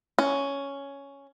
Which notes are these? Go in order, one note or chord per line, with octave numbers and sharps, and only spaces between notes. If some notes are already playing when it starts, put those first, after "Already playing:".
C#4